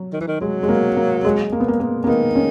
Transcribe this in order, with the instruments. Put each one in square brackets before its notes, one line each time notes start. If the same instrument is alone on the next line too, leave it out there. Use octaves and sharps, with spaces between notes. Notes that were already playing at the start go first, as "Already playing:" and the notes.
Already playing: [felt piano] F#3
[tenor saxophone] D#3
E3
D#3
[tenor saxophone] F#3 [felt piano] G#3
[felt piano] G#3
A#3
A#3
G#3
A#3
B3
A#3
A#3
A#3
[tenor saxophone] D#3 [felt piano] B3
[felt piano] C#4